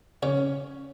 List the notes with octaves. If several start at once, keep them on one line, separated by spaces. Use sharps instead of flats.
C#3 C#4